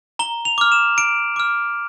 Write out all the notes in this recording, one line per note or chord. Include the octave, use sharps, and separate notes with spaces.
A#5 G7
F7
D6 F6
E7
A#5 D7
D6 F6